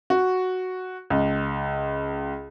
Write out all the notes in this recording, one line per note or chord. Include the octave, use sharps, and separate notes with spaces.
F#4
C#2